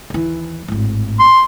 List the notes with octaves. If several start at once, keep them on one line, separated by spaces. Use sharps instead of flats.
D#2 E3
G#1 A2
C6